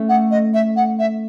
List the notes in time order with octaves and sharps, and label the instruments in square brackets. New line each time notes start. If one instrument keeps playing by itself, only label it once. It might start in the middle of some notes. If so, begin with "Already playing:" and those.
Already playing: [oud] A3 C#4
[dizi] F#5
D#5
E5
F#5
E5